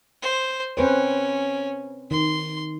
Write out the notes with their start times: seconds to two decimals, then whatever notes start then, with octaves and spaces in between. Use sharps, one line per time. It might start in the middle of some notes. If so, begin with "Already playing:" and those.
0.22 C5
0.77 C4 C#4 B4 C5
2.11 D#3 C6